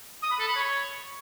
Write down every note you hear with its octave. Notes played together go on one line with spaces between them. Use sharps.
D#6
B5
A4
B5
C#5